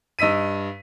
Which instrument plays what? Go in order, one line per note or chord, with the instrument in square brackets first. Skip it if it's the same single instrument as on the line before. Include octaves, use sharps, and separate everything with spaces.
[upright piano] G2 D#5 E6 B6 D#7